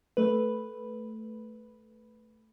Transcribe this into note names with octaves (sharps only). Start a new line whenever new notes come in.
A3 B4